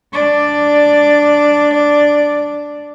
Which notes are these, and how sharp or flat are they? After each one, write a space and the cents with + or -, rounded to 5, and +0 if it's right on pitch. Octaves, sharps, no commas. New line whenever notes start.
D4 +0 D5 +0